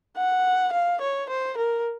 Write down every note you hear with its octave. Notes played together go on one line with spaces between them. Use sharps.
F#5
F5
C#5
C5
A#4